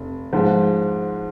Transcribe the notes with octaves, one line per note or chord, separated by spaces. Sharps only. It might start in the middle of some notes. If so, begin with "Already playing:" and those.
Already playing: F1
G#2 F3 G#3